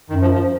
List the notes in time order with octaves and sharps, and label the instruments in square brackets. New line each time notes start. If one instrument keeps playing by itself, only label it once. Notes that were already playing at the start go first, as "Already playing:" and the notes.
[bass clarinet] F#2 [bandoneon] D#3
[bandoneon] F3
F3